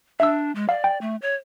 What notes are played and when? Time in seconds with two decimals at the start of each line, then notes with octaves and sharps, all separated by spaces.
0.20 D4 E5 E6
0.55 G#3
0.69 D5 F5
0.84 G5
1.01 A3
1.22 C#5